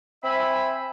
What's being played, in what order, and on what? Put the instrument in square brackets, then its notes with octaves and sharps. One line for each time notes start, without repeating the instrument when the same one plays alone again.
[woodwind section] C4 C5 E5 G#5 B5